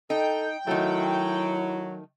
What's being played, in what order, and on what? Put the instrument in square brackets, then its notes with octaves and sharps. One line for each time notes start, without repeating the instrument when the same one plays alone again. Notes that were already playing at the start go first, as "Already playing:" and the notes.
[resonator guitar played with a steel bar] D#4 [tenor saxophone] A4 [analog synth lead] G5
[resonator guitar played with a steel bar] D#3 A3 [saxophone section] F#3 [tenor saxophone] E4